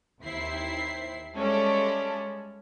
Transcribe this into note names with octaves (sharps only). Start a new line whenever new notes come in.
D#2 C4 E4 C7
G3 G#3 C#4 A4 D5 E5